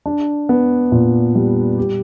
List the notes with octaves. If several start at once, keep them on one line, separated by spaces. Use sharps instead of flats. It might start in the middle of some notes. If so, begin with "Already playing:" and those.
D4
B3
A#2
G3
G4